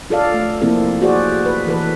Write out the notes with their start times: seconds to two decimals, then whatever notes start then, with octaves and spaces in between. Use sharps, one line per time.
0.10 F4 A4 D5 F5
0.34 A3
0.61 C3 F3 A#3 C4 E4 A4
1.02 F#4 G#4 C5 D5
1.46 B4
1.67 E3 A4 B4